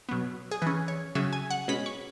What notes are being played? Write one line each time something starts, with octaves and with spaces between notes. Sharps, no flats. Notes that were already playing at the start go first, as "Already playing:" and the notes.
B2 F#3 B3
G#4
E3 C#4 B4
C#5
C#3 F#3 C#4 E5
G#5
F#5
B2 G#3 C#4 B5
C#6